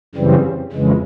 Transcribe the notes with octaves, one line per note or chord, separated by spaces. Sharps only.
F#2 C#3 E3 G3 C4
F2 C#3 E3 G#3